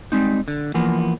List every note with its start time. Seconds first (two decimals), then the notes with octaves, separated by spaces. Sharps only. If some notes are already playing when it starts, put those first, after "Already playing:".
0.12 G3 G#3 C4 D#4
0.48 D3
0.74 E3 F3 A#3 B3